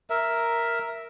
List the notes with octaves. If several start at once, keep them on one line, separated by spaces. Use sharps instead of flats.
A#4 E5